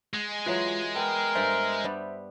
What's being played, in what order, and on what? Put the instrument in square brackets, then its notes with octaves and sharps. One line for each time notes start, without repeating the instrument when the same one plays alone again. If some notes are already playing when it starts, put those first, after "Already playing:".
[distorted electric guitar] G#3 [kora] F#5
[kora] E3 F#3 [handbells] F4
[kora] B3 [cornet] A#4 [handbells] G5
[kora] G2 A4 [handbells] C5 E5
[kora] G3 B3 D4